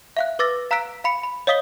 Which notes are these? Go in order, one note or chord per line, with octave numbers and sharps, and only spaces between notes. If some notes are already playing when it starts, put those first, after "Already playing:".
E5 F5 F#6
B4 D6 E6 A6 A#6
F5 A#5 E6 F#6 B6 D7
F5 B5 C#7
B5
C#5 D#5 F5 D#6 B6 G7